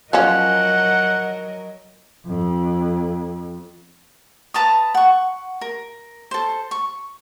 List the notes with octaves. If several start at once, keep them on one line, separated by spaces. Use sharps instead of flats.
F3 F#3 C#4 A#4 D#5 F#5
F2
B4 A5 A#5 D#6
F#5 C#6
A#4
A4 C5
C#6